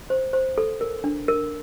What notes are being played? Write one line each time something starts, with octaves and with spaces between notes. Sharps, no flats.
C5
C5
A4
A#4
D4
A#4